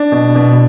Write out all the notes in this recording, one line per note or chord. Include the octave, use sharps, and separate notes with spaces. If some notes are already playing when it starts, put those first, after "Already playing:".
Already playing: D4
B2
B2